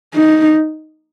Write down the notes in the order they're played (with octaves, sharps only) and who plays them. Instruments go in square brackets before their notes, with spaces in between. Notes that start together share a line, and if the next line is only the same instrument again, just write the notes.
[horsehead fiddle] D#4